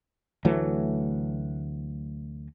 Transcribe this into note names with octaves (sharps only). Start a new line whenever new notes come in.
D2 E3 F#3 A3